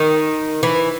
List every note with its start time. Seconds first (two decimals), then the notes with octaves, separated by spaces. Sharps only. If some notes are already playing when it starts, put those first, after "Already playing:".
Already playing: D#3
0.63 E3